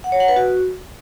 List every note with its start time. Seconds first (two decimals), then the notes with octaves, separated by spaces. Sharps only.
0.04 F#5
0.12 C#5
0.20 F#5
0.28 B4
0.36 F#4